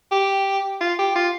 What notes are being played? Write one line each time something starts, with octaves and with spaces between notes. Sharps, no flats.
G4
F4
G4
F4